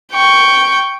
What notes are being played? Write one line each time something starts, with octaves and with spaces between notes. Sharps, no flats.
G5 C#6